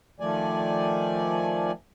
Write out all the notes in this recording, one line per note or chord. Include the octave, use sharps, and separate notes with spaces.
D#3 F3 A3 D5 G#5